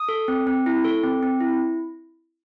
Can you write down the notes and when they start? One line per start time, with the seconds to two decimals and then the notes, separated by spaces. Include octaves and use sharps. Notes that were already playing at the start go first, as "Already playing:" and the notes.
Already playing: D#6
0.09 A4
0.28 C4
0.47 C4
0.66 E4
0.84 A4
1.03 C4
1.23 C4
1.40 E4